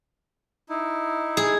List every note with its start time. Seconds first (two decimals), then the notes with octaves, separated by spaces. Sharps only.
0.69 D#4 E4
1.37 G#4